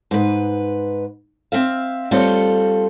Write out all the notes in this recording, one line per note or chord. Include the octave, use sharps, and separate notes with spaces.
G#2 B4
C4 E5 F5
G3 A3 C4 F4 A4 C#5